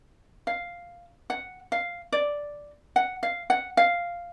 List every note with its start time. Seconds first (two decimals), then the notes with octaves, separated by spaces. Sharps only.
0.47 F5
1.30 F#5
1.72 F5
2.12 D5
2.96 F#5
3.23 F5
3.50 F#5
3.77 F5